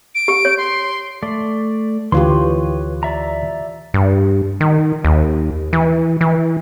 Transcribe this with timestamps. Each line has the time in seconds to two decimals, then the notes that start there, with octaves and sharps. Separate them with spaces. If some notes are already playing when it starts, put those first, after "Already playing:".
0.15 D7
0.28 G4
0.45 C#5
0.58 C6
1.23 A3 D5
2.12 D2 E3 F4 G4 B4 C#5 C6
3.03 D5 E5 A#5
3.94 G2
4.60 D#3
5.05 D#2
5.73 E3
6.21 E3